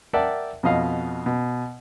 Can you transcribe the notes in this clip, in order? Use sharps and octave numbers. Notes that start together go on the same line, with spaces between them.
A#4 D5 E5 F#5 G5 A5
F2 B2 D#5 F5
B2